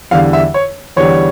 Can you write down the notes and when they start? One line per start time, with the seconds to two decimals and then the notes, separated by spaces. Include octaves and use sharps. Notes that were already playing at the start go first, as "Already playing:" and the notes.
0.11 E2 D3 G3 F5
0.33 E5
0.54 C#5
0.97 E2 D3 G3 C#5